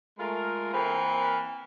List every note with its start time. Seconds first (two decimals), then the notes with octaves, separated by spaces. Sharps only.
0.19 G#3 A3 F4 A#4
0.74 E3 A#3 C4 A#4